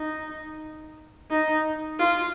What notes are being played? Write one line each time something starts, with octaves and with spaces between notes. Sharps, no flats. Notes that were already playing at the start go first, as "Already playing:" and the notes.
Already playing: D#4
D#4
F4